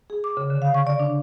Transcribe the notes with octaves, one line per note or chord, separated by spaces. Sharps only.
G#4
D6
C#3
D3
F5
C#6
D5
D4